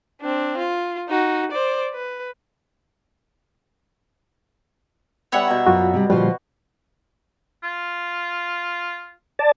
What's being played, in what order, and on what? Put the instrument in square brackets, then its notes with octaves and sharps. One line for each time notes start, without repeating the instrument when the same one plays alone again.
[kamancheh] C4 D4
F4
D#4 F#4
C5 D5
B4
[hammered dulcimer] G3 B3 [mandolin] C#5 E5 F#5
[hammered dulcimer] B2 A#5
[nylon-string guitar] F#2 [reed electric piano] F4 F#4
[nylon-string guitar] C3 G3
[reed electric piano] A#2 D3 G3 [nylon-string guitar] F3 F4 C5 [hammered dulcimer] F#4
[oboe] F4
[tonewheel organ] D5 A5